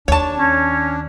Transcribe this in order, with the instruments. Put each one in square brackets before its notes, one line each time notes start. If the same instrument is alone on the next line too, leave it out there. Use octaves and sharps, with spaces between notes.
[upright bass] D#2 [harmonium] D4 [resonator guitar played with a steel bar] C#5 A5
[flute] C#4